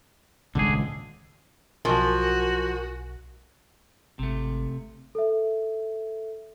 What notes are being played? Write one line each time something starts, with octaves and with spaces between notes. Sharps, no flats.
D#1 G#1 C#2 D3 G#4
B1 F3 F#4 A#4 G#5 C#6
G#1 C3 A3
A4 E5